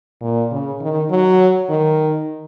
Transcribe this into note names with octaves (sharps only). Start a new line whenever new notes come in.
A#2
C#3
D#3
F#3
D#3